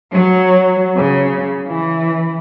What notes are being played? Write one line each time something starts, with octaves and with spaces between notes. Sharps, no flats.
F#3
C#3
E3